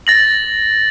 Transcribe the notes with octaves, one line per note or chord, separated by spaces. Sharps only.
A6 A#6 F#7